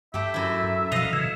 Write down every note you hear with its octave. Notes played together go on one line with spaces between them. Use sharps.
G2 A3 G4 E5
F#2 E4
B2 F3 D#5 F5
C#3 E3